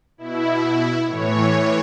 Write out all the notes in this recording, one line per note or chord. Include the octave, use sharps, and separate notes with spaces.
B2 E4
A2 E3 C#5